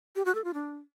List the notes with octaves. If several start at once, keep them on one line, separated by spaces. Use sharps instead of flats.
G4
F#4
A4
F4
D4